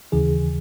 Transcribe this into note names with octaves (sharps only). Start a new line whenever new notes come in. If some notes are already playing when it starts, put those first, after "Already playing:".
D#2 C#3 E3 G#4